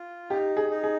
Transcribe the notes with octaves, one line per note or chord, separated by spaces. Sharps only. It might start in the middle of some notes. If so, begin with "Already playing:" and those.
Already playing: F4
D#4 G4
G#4
D#4
G#4